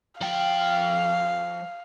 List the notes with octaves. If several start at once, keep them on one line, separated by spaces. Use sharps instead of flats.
F3 F5 G5